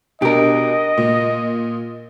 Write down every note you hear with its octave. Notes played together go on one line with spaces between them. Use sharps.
B2 D4 G4 A#4 D#5
A#2